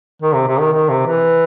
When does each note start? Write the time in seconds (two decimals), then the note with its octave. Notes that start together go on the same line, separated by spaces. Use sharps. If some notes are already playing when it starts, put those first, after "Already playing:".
0.22 D#3
0.35 C3
0.47 C3
0.60 D#3
0.73 D#3
0.90 C3
1.06 E3